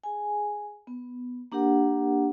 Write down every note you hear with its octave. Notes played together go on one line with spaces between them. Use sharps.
G#4 G#5
B3
A#3 D4 G4 A#4 F#5